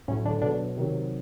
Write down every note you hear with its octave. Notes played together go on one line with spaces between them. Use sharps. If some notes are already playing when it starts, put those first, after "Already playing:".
A2 F#3 C#4
D3 D4
B2 D3 F#3 D4
C3 D#3 F#3